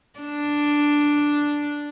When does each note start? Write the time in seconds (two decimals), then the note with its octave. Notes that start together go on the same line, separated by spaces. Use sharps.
0.20 D4